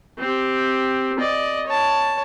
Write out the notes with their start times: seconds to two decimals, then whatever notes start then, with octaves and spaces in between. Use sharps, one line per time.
0.19 C4 G4
1.19 D5 D#5
1.67 C#5 A5